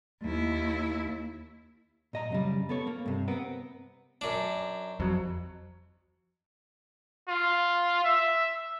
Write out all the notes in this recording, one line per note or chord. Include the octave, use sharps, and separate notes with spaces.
D#2 E4
A#2 D#5 A#5
F#2 C#3 G3
B3 A4 C#5
A#3
G2 C3
B3 C4 A#4
F#2 D4
F2 F#3
F4
E5